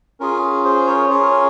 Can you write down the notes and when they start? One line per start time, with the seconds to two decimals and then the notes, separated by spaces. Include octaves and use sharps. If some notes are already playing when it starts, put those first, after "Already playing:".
0.20 C#4 F4 G#4 A#4
0.42 G#4
0.64 G#4 C5
0.87 A#4 C#5
1.10 C#4 F4 G#4 A#4 C#5